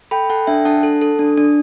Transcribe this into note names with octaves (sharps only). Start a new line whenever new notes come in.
A4 G5 B5
A4 F#5 A5
D4 E5 G5
D4 F#5 A5
A4
A4
D4
D4